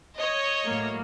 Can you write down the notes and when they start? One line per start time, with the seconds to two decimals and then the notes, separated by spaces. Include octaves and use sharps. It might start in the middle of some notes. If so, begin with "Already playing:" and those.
0.17 C#5 D#5
0.64 A2 F#3 A#3